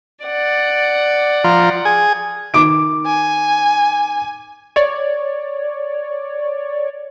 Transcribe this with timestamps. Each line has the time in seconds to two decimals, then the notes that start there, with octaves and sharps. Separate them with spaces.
0.24 D5 F#5
1.44 F3 F4 A#5
1.85 G#4 G#5
2.54 D#3 D6 D7
3.06 G#5
4.76 C#5 D5